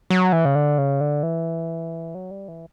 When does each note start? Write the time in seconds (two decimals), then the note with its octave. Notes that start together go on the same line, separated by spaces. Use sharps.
0.10 F#3
0.32 E3
0.45 C#3
0.55 D3
0.78 C#3
1.01 D3
1.23 E3
2.15 F#3
2.31 G3
2.48 E3